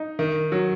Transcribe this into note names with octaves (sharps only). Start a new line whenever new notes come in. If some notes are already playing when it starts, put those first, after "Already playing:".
Already playing: D#4
D#3
F#3